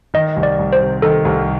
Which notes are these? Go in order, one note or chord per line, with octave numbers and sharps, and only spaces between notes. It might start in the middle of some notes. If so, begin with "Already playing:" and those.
D#3 D#5
C2
D5
C2
C5
C3
D#3 A4
C2